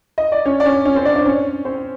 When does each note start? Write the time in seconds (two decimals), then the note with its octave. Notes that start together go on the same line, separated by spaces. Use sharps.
0.18 D#5
0.32 D5
0.45 C#4 C#5
0.60 D5
0.65 C#4 C#5
0.85 C#4 C#5
0.95 C4 C5
1.05 D4 D5
1.16 D4 D5
1.25 C#4 C#5
1.65 C4 C5